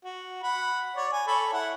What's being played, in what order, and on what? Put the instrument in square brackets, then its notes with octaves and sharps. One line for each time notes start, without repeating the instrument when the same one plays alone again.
[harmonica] F#4
F#5 B5
C#5 D5
G#5
A4 C#5 B5
E4 F#5